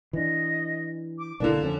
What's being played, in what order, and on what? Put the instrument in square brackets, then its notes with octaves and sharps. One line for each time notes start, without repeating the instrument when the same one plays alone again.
[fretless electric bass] E3 D4 [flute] D#5
[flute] D6
[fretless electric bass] B1 A#3 [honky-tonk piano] D3 D4 [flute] A5
[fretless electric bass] F2 F3 C#4